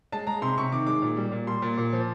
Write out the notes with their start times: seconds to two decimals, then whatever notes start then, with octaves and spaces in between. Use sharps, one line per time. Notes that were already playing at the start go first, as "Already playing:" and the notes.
0.12 G#3 A5
0.27 G#3 A#5
0.42 C3 C6
0.58 C3 C#6
0.72 D#3 D6
0.87 G#3 D6
1.02 A#2
1.17 G3
1.32 A#2
1.47 G3 C6
1.62 A#2
1.78 A#2
1.93 F3